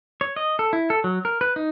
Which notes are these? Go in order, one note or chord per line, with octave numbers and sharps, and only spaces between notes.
C#5
D#5
A4
E4
A4
F#3
A#4
B4
D#4